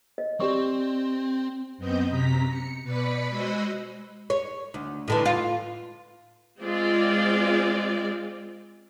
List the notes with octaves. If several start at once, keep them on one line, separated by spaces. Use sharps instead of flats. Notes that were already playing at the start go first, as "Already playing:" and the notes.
D#5
C4 G4 D5 C#6
F#2 B3 C4 D#5 G6
F#2 C3 A#5 B6
C#7
B2 B4 D5 B5 B6 C#7
G#3 F#4 C5 D#5 B5 E6
C#5
D2
A2 D3 E3
F4
G#3 C4 F4 D5